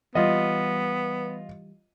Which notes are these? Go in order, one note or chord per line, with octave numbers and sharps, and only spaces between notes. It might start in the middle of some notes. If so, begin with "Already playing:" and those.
E3 G3 B3 F4 D#5